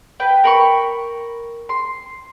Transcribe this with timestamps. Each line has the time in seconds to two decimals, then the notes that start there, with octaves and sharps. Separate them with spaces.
0.20 B4 G5
0.44 A#4 B5 C#6
1.69 C6